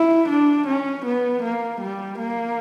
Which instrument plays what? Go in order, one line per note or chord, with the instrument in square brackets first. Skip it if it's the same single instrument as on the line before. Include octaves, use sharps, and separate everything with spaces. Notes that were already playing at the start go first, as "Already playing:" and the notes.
Already playing: [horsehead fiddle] E4
D4
C#4
B3
A#3
G3
A#3